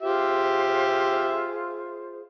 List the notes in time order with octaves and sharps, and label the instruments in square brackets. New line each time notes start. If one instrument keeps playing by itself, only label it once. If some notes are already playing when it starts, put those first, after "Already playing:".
[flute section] F4 G#4 C5 [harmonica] G4 E5